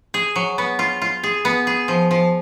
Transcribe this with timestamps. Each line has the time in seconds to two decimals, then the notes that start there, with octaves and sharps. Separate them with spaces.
0.14 G#4
0.36 F#3
0.58 B3
0.79 F4
1.02 F4
1.23 G#4
1.45 B3
1.67 G#4
1.88 F3
2.11 F3